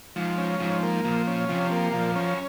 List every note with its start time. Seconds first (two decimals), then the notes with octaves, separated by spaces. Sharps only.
0.16 G#2 F3
0.38 C#4
0.60 G#2 F3
0.83 A#3
1.05 A#2 F3
1.27 C#4
1.49 C3 F3
1.72 A#3
1.93 A#2 F3
2.16 F#2 C#4